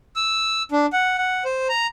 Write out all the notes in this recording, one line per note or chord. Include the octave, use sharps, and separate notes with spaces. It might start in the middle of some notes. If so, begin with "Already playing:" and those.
E6
D4
F#5
F#5
C5
A#5